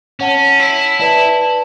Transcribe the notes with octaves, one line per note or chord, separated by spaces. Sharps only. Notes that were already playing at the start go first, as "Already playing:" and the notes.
C#4 C#5 F#5 A5
E4
E4 B4 D5 A5